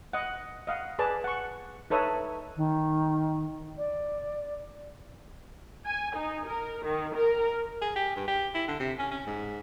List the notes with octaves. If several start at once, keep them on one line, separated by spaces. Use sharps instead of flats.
D#5 F#5
D#5 F5 F#5
G#4 B4 D5 A5
F#5 C#6
D#4 A4 B4 C#5 E5 D#6
D#3
D5
G#5
D#4
A#4
D#3
A#4
G#4
G4
G2
G4
E4
D3
C3
C#4
C#4
G#2